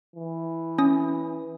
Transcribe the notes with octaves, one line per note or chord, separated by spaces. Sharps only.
E3
C#4 D#6